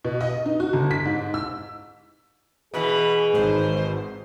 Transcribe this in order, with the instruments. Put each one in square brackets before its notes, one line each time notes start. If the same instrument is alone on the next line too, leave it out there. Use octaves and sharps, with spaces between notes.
[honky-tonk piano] B2
D#5
D#4
F#4
G1
B6
G#2
E6
[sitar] B2 E3 [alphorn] G#4 [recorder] B5
[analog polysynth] G#1 G#2 [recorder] C5